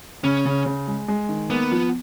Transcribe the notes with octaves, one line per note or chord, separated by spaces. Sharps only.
C#3 C#4
C#3
C#3
G#3
G#3
D#3
A#3 B3
F3